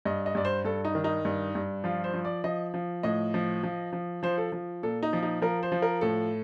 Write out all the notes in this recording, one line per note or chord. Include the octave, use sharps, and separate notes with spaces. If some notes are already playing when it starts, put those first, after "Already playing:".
G2 D#5
D#5
G2 D5
C5
G2 A4
D#4
D#3
D#4
G2
G2
F3 F4
C5
F3
D5
F3 D#5
F3
A2 D#5
F3
F3
F3
F3 C5
A4
F3
A#2 A4
D#4
F3
D#4
F3 A#4
C5
F3
A#4
A2 A4